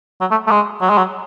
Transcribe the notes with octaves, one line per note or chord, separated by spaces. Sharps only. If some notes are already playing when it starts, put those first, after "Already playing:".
F#3
A3
A3
G#3
F#3
G#3
F#3